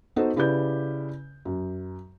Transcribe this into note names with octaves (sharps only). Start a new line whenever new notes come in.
B3 D#4 F#4 A4 C5
C#3 E4 G4 B4 D5 G6
F#2